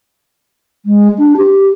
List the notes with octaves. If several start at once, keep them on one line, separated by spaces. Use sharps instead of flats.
G#3
D4
G4